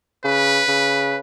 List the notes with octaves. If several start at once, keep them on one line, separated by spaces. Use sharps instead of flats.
C#3 B4
C#3